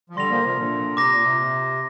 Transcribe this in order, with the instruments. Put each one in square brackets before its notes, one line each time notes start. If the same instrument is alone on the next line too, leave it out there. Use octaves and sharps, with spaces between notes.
[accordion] F3
[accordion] D3 G3 [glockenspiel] C6 A#6 F7
[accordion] F3 A#3
C3 F3
A#2 D3
[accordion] C3 [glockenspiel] A#5 D6 A#6
[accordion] A#2
C3